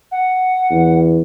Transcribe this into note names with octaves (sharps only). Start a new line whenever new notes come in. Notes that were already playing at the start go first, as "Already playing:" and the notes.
F#5
E2